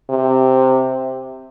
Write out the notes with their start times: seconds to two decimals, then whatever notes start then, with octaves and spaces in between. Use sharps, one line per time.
0.10 C3